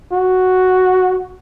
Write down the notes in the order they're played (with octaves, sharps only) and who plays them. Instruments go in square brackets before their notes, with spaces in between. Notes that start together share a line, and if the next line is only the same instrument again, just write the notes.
[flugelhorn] F#4